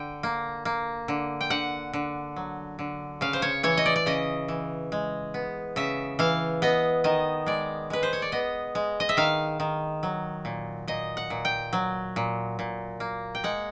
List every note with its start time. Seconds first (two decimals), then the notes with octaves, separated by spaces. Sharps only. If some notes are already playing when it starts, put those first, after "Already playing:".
Already playing: D3 G5
0.23 A#3
0.65 A#3
1.08 D3
1.41 G5
1.50 D3 F#5
1.93 D3
2.36 F#3
2.79 D3
3.21 C#3 F5
3.33 C5
3.42 C#5
3.63 E3 C#5
3.77 D#5
3.86 D5
3.96 D5
4.06 C#3 D#5
4.48 E3
4.92 G#3
5.34 B3
5.76 C#3 E5
6.19 E3 F5
6.62 B3 D#5
7.04 D#3 D#5
7.46 G#3 D5
7.90 G#3 B4
8.03 C5
8.13 C#5
8.22 D5
8.32 B3 D#5
8.75 G#3
9.00 D#5
9.09 E5
9.17 D#3 F5
9.60 D#3
10.03 F#3
10.45 A#2
10.88 A#2 D#5
11.17 F#5
11.30 A#2
11.45 G5
11.73 F#3
12.16 A#2
12.59 A#2
13.00 A#3
13.35 G5
13.44 G#3 F#5